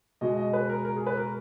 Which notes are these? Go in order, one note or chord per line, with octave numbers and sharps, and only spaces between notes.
B2 G#3 D#5
D#5
B4
A#4
A#4
G#4
B4
A#4